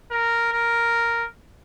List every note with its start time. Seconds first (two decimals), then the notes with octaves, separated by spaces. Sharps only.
0.11 A#4
0.52 A#4